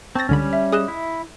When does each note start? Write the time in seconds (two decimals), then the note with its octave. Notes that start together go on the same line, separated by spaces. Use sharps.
0.15 C4 A5 C#6 A6 A#6
0.29 C#2 D3 G3 C#4 B5
0.53 E5
0.72 G#4 D#5 D#6 F#6 E7
0.88 E4